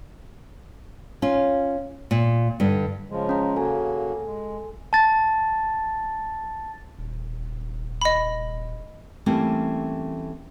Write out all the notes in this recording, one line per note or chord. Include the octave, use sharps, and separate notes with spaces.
C#4 F4
A#2
G2 D3
C#3 F3 G#3
C#4 A#5
C#3 A#3 F#4 A4 G#5
G#3
A5 A6
D#1
D#5 B5
E3 G3 A3 A#3 C4 C#4